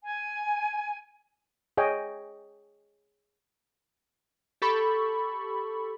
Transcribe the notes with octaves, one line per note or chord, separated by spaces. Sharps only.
G#5
G#4 C#5 D#5 G5 G#5
G4 A4 B5 C#6